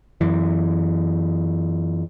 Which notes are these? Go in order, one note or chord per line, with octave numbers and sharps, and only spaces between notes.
F#2 E3